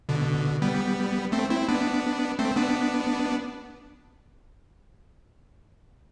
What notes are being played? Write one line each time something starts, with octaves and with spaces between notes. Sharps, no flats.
B2 D3
G3 B3
A3 C4
C4 E4
B3 D4
A3 C4
B3 D4